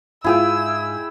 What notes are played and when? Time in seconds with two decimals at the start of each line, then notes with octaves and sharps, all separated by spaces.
0.24 G#2 E4 F4 G#4 G5 E6